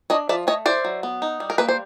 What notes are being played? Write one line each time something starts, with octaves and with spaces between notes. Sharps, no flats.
D4 C#5 D#5
F3 D5 E5
A3 C#5 D#5
E4 C5 D5
F#3
B3
D#4
G3
A#4
A#3 B4
C5